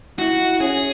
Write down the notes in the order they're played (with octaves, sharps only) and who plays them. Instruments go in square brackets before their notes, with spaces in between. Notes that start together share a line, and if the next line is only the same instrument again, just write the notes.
[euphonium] E4 [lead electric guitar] F#4
[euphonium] C#4 [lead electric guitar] G#4